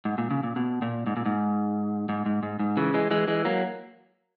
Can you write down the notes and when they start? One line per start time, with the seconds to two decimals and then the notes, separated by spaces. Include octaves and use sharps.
0.05 G#2
0.18 A#2
0.31 C#3
0.43 A#2
0.56 B2
0.82 A#2
1.06 G#2
1.17 A#2
1.26 G#2
2.09 G#2
2.26 G#2
2.43 G#2
2.59 G#2
2.77 C#3 E3
2.94 E3 G#3
3.11 E3 G#3
3.28 E3 G#3
3.45 F#3 A#3